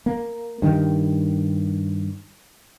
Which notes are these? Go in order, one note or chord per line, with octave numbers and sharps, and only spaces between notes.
A#3
G2 D#3